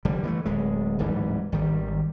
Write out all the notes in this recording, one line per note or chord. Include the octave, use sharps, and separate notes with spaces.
F1 D3 G3
E3 G3 A3
D1 G#3
D1 G#2 E3 G3
G#1 D#3 G3